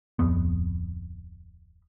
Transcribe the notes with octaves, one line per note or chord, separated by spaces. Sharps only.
D1 F2 B3